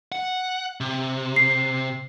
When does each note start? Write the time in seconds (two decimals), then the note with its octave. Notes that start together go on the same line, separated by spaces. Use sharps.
0.12 F#5
0.81 C3
1.36 C7